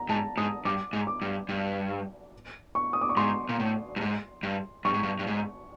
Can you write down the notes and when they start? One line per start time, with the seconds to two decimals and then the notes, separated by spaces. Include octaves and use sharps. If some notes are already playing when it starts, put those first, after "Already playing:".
Already playing: A#5
0.09 G#2 A5
0.37 G#2 D#6
0.65 G2 D6
0.93 G#2
1.07 D6
1.21 G2
1.49 G2
2.75 C#6
2.93 D#6
3.01 D6
3.09 C#6
3.17 G#2 C6
3.49 A#2
3.60 A2
3.96 G2
4.01 G#2
4.43 G2
4.85 G2 C#6
4.94 G#2
5.03 G2
5.19 G2
5.27 G#2